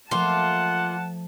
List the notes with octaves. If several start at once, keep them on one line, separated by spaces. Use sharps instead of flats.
F3 A3 A#3 F4 F#5 A5